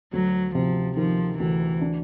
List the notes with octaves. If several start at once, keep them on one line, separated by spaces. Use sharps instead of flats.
D2 F#3
C3 F3
D#3 F3
D2 E3
D4